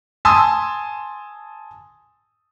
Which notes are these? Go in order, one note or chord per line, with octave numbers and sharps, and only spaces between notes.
G#5 A5 C6 D#6 E6